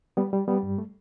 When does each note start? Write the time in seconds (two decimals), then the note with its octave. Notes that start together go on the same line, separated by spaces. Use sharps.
0.17 G3 B3
0.33 G3
0.48 G3 B3
0.63 G2
0.78 A3